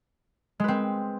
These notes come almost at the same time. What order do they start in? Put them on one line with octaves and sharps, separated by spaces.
G#3 B4 C4